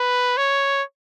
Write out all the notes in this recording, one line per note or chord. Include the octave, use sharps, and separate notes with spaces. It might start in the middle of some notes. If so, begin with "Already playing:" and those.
Already playing: B4
C#5